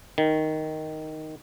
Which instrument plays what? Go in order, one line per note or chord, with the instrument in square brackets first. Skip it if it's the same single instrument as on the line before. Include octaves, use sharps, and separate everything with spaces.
[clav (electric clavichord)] D#3